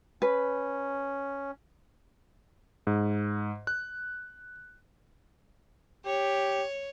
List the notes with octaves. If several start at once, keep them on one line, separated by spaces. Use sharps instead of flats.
C#4 B4
G#2
F#6
G4 C#5